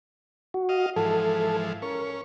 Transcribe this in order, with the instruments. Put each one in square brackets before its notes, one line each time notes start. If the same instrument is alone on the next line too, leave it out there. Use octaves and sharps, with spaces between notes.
[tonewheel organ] F#4
[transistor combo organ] D#5 F5
[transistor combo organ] G#2 E3 F3 [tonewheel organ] A4
[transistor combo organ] C#4 [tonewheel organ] A#4